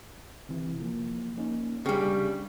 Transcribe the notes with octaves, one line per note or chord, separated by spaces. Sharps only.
C3 E3
F3 A#3
A#3 C#4 D#4
C#3 G3 D4 G4 G#4